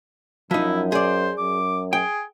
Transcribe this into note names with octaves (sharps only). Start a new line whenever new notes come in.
F#2 F3 D#4 E4
G#4 C5 D5
F#2 D6
G#4 G5